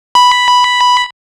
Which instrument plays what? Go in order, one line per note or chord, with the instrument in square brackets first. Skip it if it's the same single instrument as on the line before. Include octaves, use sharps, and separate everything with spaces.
[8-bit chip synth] B5